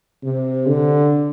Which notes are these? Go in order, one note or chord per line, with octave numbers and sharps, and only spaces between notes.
C3
D3